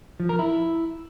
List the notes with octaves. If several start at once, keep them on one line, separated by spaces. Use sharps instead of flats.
F3
A#4
E4